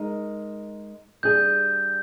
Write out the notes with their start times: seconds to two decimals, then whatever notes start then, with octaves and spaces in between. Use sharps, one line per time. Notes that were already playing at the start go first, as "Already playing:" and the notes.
Already playing: G#3 D#4 A#4
1.23 G3 D4 G#4 G6